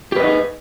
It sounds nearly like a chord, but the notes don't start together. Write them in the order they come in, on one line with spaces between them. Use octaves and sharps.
G4 B4 D#5 D#4 G#4